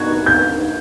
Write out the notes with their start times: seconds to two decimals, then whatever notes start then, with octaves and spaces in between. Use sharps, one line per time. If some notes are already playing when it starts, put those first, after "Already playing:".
Already playing: B2 G3 B3 D#4 F#4 G#6
0.26 G6